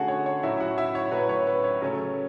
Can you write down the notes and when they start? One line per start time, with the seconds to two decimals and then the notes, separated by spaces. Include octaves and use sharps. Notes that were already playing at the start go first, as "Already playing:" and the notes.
Already playing: D3 A3 C#4 F#4 G#4 F#5 G#5 A5
0.08 C#5
0.26 C#5
0.43 A2 F#3 C#4 E4 E5
0.60 F#4 F#5
0.78 E4 E5
0.95 C#5
1.11 A2 F#3 C#4 B4
1.29 C#5
1.47 B4
1.64 C#5
1.81 C#3 F#3 A3 C#4